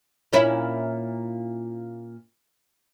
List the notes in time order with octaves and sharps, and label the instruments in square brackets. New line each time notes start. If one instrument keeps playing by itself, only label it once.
[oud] A#2 C#4 E4